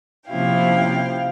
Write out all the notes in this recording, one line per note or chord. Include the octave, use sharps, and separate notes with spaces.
C3 F3 A#3 C#4 E4 F5 G5